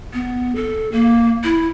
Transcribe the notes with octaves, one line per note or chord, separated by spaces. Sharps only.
B3
A4
A#3
E4